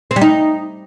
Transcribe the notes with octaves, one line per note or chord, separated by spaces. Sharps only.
C4
G3
D#4